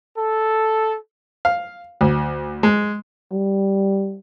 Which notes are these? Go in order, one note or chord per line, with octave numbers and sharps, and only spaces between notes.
A4
F5
D2
G#3
G3